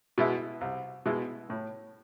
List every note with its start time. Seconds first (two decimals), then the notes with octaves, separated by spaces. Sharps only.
0.18 B2 G#3 B3 E4
0.61 C2
1.06 B2 G#3 B3 E4
1.50 A2